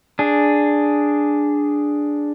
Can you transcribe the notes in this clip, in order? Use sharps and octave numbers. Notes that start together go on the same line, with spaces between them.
D4 G#4